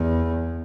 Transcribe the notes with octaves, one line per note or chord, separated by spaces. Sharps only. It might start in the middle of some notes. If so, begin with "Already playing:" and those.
Already playing: E2